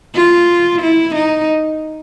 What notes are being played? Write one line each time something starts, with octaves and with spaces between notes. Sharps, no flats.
F4
E4
D#4